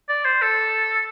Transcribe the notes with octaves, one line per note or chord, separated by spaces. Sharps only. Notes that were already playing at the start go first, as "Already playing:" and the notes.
D5
C5
A4